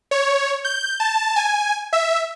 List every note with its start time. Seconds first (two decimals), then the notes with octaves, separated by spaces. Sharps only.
0.11 C#5
0.65 G6
1.00 A5
1.36 G#5
1.93 E5